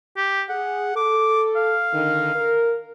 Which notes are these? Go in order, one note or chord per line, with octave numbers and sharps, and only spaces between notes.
G4
G#4 F#5
A4 D6
F5
D3 D#3
A#4